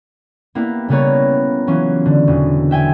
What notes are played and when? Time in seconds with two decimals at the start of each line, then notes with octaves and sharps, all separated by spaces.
0.55 A#3 B3 E4 G4
0.89 C#3 G3 A#3 B3 A#4 C#5
1.67 E3 F#3 C#4 F4
2.06 D3
2.28 E1
2.71 E5 G5 G#5